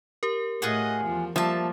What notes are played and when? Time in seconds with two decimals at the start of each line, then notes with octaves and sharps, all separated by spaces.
0.23 G4 A#4
0.62 A2 F4 G#4 D#5 F#5
1.04 E2 F3
1.36 F3 G3 A#3 E5 A5